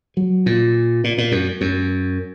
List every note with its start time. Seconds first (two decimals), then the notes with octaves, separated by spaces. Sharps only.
0.17 F#3
0.46 A#2
1.04 A#2
1.18 A#2
1.32 F#2
1.61 F#2